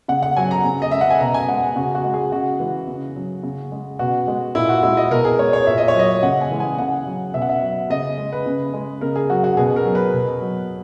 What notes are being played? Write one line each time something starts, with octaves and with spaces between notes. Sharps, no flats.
C#3 F#5
F#5
F#3 G#5
A#5
C#3
D#5
G#3 E5
F#5
G#5
B2 A#5
G#5
G#3 F#5
C#3 F#4
F#4
G#3
G#4
C#3 F#4
E3 G#3
C#3
F#3
C#3
G#3
B2 F#4
G#3
A#2 E4
F#4
G#3 E4
D#5
B2 A#4
G#4
G#3 C#5
C#5
A#2 E5
D#5
C#5
F#3 D#5
C#3 F#5
G#5
E3 G#3
G#5
C#3 F#5
F#3
B2 E5
F#5
E5
F#3
C#3 D#5
G#3
B4
C#3
G#3
C#3 A#4
G#4
F#3 F#4
F#4
B2 G#4
A#4
F#3
B4
B2
F#3